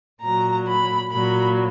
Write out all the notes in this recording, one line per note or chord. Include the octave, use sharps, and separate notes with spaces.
A#2 F#3 A#5
B5
A#2 F#3 B5